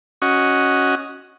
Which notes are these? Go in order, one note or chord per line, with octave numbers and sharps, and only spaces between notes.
C#4 F#4 D#5